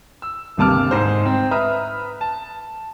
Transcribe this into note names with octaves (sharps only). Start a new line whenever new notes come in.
E6
G1 D#2 C3 A5 D6 F6
G#2 C5
C4
B4 E5 A#5 D#6 F6
A5